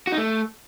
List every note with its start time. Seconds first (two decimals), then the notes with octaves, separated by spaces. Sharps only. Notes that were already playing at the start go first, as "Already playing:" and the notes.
0.07 F#4
0.12 D#4
0.17 A3